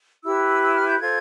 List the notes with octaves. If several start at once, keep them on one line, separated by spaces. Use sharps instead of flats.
E4 G4 B4 E6
E6
F6
G6
F4 A4 C5 G#6